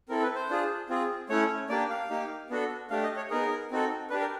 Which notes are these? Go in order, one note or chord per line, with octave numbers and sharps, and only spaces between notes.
C4 E4 A4 A#4
B4
C5
D4 F4 G#4
C4 F4 G#4
A3 C#4 E4 C#5
A#3 D4 G4 D5
F5
A#3 D#4 G4
B3 D4 F#4 A4
A3 D4 G4 F5
D#5
C#5
B3 D#4 G#4 A#4
C4 D#4 F#4 A4
D4 G4 B4
A#4